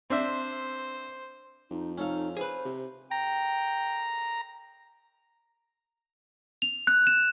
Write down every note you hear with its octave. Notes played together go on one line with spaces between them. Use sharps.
C4 D4 C5 E5
F2 D#4
C#4 D#4 A4 F5
G#4 B4 C5
C3
G5 A#5
F7
F#6
E7